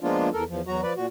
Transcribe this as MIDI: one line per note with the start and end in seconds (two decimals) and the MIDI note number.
0.01 0.29 53
0.01 0.29 56
0.01 0.29 58
0.01 0.29 59
0.01 0.29 62
0.01 0.29 65
0.33 0.44 40
0.33 0.44 69
0.33 0.44 70
0.49 0.61 40
0.49 0.61 53
0.67 0.81 40
0.67 0.81 54
0.67 0.81 66
0.67 0.81 82
0.83 0.93 53
0.83 0.93 71
0.83 0.93 74
0.97 1.06 46
0.97 1.06 66